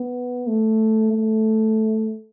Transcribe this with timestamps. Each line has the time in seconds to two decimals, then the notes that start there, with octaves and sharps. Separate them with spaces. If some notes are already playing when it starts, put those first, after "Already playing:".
Already playing: B3
0.47 A3
1.12 A3